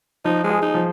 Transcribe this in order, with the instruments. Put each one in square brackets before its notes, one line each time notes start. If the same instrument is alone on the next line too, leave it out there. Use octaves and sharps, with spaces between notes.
[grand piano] F3 [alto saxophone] D#4
[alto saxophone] G#3
[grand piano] G#4
[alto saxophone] D#4
[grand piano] F3